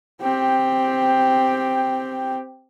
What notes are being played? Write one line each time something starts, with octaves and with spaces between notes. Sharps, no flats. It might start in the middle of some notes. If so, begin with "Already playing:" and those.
C4 G4